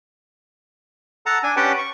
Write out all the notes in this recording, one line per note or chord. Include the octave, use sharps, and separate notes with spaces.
A4 F#5 A5 A#5
D4 G#5
C#4 G4 B4 F#5 G5 A5
C#6